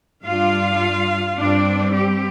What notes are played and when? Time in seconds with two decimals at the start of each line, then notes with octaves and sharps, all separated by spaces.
0.23 G2 G3 D4 F4 F5
1.39 G2 G3 C4 D4 D5
1.97 G4